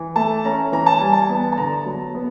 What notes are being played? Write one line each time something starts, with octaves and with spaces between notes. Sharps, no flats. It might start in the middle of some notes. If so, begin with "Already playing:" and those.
Already playing: E3
A3 A5
C#4 A#5
E3 A#5
A5
G3 G#5
A5
B3
A5
D3 A#5
F#3
B3